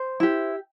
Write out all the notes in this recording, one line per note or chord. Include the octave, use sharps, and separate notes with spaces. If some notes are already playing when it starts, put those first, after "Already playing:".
Already playing: C5
E4 G4